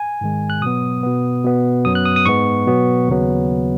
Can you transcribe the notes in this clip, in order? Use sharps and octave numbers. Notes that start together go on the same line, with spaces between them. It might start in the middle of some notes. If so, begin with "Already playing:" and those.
Already playing: G#5
G#2 D#3 G#3
F#6
B2 F#3 B3 D#6
B2 B3
B2 B3
F#2 F#3 B3 D#6
F#6
D#6
D#6
G#2 G#3 B3 C#6
B2 F#3 B3
D#2 C#3 F#3 B3